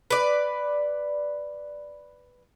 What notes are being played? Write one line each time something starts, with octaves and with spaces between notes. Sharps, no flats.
B4 D5